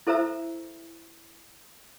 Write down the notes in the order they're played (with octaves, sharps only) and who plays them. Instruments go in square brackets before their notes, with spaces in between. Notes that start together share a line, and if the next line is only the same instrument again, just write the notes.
[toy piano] E4 A4 C5 E5 A#5 E6